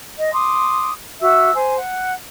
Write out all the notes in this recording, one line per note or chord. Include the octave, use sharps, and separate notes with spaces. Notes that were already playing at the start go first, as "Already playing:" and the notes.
D#5
C6 D6 D#6
F#4 E5 E6
C5 G#5
F#5